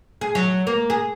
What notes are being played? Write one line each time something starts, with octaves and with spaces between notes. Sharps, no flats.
G#4
F#3
A#3
G#4